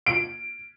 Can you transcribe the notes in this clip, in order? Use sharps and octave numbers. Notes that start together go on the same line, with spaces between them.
D7